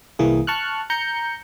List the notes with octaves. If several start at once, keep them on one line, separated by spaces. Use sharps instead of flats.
C2 E3 A#3 G#4
A5 C#6 F6 F#6
A#5 G6 C#7